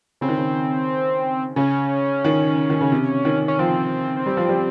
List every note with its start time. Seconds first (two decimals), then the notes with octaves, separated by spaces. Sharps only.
0.21 C#3 C4
0.28 D#3
0.37 C#3
1.56 C#3 C#4
2.24 D#3
2.70 D#3
2.81 C#3
2.92 C3
3.25 D#3
3.48 C#4
3.59 F3 C4
4.26 G3
4.37 F3
4.49 G3